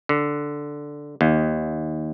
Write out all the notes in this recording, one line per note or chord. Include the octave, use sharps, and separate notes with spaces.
D3
D#2